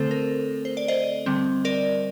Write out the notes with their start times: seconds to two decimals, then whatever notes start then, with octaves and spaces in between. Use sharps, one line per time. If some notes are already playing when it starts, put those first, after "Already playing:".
Already playing: D3 A3 C4 A4 C5
0.11 A#4
0.65 C5
0.77 D5
0.88 C5 D#5
1.26 D3 G3 C4
1.65 A#4 D5